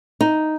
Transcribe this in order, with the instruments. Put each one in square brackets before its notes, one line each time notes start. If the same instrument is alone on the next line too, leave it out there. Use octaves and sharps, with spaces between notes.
[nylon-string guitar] D#4